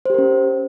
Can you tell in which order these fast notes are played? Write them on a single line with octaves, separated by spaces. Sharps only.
C5 G4 A#4 C#4